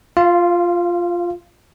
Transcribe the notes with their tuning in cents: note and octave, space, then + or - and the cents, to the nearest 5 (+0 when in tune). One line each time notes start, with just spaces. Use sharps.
F4 +0 F5 -30